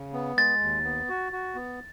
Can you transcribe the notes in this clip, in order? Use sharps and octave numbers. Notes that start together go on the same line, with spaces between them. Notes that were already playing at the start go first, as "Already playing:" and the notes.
Already playing: C#3
B3
G#3 A6
D#2
B3
F#4
F#4
B3